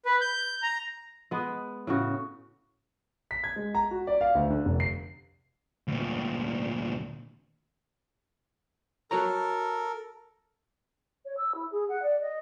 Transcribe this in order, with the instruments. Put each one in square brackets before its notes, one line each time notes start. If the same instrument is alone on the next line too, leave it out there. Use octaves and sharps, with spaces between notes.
[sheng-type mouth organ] B4
G6
A#5
[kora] G#3 B3
A2 C#3 F#4
[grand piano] B6
G#6
G#3
A#5
F#4
D5
F5
D2
D3
F1
C7
[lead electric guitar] D2 A#2
[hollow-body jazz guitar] F#4 C#5 A#5 [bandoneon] A4 A#4
[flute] C#5
E6
E4
G#4
F#5
D5
D#5